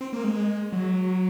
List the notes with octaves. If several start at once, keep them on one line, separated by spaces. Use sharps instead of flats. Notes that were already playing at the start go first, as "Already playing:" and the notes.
C4
A#3
G#3
F#3